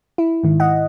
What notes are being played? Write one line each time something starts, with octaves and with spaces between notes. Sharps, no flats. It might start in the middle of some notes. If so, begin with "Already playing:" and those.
E4
G#2 D#3
D#5 F#5